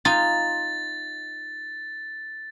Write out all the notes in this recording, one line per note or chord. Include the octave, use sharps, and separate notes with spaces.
D#4 F4 G#5 A6